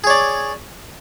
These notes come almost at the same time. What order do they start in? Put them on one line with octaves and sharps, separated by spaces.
G#4 C#5 D5